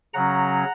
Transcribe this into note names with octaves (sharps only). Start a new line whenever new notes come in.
C#3 F#3 C#4 F#5 A#5